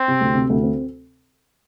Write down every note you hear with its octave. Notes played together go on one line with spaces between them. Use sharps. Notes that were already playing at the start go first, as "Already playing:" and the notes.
Already playing: C4
C3
D2
C3
D2
C4